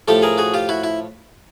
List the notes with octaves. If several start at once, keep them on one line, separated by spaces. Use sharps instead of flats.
A2 F3 A3 G4 A4
G#4 A#4
F#4 G#4
F4 G4
E4 F#4
E4